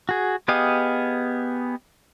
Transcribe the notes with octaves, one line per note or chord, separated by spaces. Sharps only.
F#4 G#4
B3 G4 G#4 D#5 F5